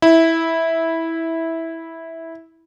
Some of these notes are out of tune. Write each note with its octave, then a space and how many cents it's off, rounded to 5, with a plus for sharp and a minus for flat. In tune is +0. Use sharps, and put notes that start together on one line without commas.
E4 -10